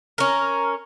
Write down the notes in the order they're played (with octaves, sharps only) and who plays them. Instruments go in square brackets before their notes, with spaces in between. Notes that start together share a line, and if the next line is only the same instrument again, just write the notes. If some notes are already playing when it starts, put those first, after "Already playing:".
[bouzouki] C#4 A#4